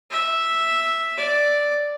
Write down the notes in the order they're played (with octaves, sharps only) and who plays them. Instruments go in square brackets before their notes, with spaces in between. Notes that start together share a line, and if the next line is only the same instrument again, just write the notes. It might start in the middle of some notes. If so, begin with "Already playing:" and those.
[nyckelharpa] E5
D5